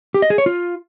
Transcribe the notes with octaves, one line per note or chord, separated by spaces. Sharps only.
G4
D#5
G#4
C#5
F4